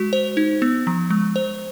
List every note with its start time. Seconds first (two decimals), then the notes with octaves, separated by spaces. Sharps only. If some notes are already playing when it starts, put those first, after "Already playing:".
Already playing: G#3 F#4
0.13 C5
0.37 D#4
0.62 B3
0.87 F3
1.10 G#3
1.36 C5